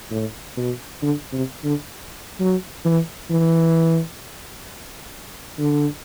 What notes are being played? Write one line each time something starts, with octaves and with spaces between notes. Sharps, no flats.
A2
B2
D3
C3
D3
F#3
E3
E3
D3